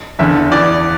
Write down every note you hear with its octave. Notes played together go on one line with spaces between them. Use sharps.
F#1 E2 D3 E5
E2 E3 D5